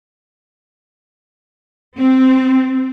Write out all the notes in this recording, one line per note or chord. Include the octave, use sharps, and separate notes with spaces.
C4